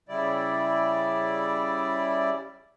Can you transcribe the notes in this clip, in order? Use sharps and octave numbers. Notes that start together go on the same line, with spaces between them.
C#3 G3 E4 D5